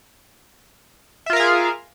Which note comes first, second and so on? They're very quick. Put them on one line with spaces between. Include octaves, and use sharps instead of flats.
E5 F4 A#4 F5 G#4